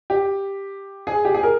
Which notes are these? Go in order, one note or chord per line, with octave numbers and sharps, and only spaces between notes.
G4
G#4
G4
G#4
A#4